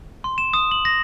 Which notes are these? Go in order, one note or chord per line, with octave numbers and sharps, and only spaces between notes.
C6
E7
D#6
F#7
A#6